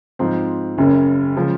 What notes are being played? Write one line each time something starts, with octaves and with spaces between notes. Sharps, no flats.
G#2 F3 C4
F#1 F#2 C#3
C#3 F3 G#3